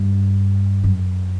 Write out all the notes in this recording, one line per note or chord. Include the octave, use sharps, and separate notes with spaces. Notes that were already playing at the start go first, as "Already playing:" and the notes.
Already playing: G2
F#2